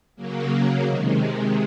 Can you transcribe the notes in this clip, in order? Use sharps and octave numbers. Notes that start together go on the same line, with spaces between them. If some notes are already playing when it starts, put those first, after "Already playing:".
C#3 F#3 A#3
C3 D#3 G#3